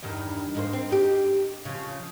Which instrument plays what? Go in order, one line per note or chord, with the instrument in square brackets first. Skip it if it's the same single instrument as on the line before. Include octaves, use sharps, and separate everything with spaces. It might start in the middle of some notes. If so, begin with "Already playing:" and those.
[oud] E2 G2 D#3
G#2 A#3 C5
C4
D#4 G4
C#3 F3